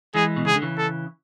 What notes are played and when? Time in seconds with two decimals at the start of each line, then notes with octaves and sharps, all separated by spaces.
0.14 E3 G#3 G#4
0.36 B2
0.45 C#3 G#4
0.54 D3
0.62 C#3 E3
0.78 A4